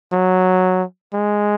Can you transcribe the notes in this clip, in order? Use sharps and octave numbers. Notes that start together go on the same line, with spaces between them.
F#3
G#3